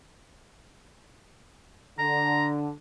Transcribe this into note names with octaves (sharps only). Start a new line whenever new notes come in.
D3 A#5